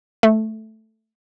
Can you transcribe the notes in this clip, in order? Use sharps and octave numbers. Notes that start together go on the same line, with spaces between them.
A3